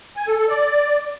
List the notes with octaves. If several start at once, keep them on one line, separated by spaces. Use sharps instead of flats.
G#5
A4
A4
D5